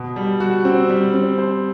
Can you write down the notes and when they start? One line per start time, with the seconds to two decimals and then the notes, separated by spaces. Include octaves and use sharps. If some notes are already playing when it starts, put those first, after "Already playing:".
Already playing: B2
0.16 G3
0.40 F#4
0.65 C4
0.90 G3
1.14 C4
1.38 C5